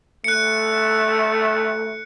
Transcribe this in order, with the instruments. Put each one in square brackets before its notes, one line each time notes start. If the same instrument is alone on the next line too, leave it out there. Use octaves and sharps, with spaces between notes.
[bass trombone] A3 [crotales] F#6 C#7